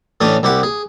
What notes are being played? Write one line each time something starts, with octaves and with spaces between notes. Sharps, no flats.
A2 E3 C#4 D4 D#6
C2 E4 G4 F#5
G#4